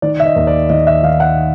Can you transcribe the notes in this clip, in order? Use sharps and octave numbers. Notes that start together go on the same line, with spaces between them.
D#3 D5
E5
D#5
D#2
D5
D#3 D#5
E5
D#3 F5
F#5